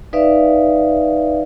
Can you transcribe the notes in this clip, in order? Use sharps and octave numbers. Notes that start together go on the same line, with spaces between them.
D#4 B4 D5 E5 F5